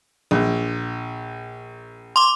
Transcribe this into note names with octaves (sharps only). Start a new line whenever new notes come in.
A#1
C6 D6